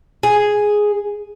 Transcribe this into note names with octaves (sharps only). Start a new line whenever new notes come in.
G#4